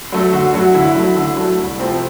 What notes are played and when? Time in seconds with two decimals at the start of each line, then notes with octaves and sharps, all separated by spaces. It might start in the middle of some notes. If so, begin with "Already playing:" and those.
0.12 F#3 A3
0.33 D3 F#4
0.53 F#3 A3 F#4
0.74 D3 E4
0.95 F#3 A3
1.17 D3
1.37 F#3 A3
1.58 C2
1.79 C3 F3 A3 C4